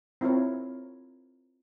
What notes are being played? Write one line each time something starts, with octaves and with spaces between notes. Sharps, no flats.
C4 E4 F4 A#4 C#5